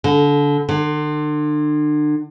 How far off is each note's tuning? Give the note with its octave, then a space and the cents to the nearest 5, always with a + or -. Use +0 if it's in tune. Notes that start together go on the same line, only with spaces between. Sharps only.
D3 -25
D3 +40